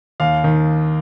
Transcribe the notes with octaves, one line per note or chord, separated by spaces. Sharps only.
D#2 F5
D#3